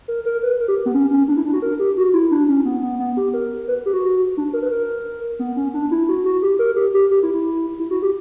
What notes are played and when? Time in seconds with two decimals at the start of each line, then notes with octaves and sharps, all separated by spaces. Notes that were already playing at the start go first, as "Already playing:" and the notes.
0.08 A#4
0.25 A#4
0.43 B4
0.60 A#4
0.68 G4
0.86 B3
0.94 C#4
1.11 C#4
1.28 D4
1.37 E4
1.45 D4
1.53 F#4
1.62 A#4
1.79 G4
1.97 F#4
2.14 E4
2.31 D4
2.49 C#4
2.65 B3
2.83 B3
2.99 B3
3.17 G4
3.33 A#4
3.68 B4
3.86 G4
3.93 F#4
4.37 D4
4.53 A#4
4.62 B4
4.71 A#4
5.39 B3
5.56 C#4
5.74 D4
5.91 E4
6.09 F#4
6.25 F#4
6.42 G4
6.59 A#4
6.76 G4
6.94 G4
7.11 G4
7.23 E4
7.34 E4
7.80 E4
7.91 F#4
8.02 G4